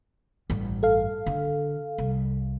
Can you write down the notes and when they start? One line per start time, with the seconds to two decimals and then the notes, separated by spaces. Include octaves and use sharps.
0.50 A1 G2
0.83 A4 F5
1.27 D3
1.98 C2